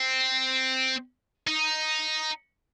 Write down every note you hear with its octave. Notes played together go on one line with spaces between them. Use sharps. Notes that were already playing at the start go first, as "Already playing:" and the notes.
Already playing: C4
D#4